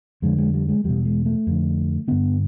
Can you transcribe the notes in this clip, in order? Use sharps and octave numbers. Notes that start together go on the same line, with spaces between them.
F2 D3 G#3
G#3
G3
G#3
E2 B2 G3
G#3
A3
F2 D3
G2 D3 B3